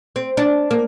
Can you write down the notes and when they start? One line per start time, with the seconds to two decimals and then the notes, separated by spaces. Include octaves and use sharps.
0.16 C4
0.37 D4
0.71 A#3